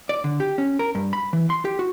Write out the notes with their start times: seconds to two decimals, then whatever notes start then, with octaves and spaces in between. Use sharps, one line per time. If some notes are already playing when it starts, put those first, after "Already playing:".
0.09 D5
0.24 D3
0.40 G4
0.58 C#4
0.79 A#4
0.95 G2
1.13 B5
1.33 E3
1.50 C6
1.65 G4
1.79 F#4